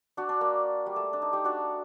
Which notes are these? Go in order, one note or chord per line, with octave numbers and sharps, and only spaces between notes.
D4 F#4
D4
A#3
G3
A3
D4
D#4
D#4 G4
D4 F#4